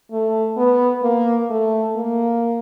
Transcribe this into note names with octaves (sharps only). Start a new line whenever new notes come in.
A3
B3
A#3
A3
A#3